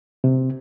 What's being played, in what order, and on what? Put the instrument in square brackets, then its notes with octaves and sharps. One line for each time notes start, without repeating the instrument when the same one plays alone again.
[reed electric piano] C3